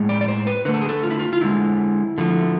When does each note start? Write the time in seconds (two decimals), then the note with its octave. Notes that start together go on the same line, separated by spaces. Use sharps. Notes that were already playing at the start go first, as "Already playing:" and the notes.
Already playing: A2 G#3
0.09 D5
0.21 D5
0.28 C5
0.47 B4
0.65 D3 B4
0.68 A3
0.74 A4
0.81 G#4
0.89 A4
1.03 F4
1.11 E4
1.19 F4
1.33 F4
1.41 D3 F3 G#3 E4
2.18 D3 F3 A3